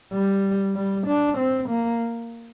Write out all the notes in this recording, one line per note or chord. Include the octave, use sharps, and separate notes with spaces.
G3
G3
D4
C4
A#3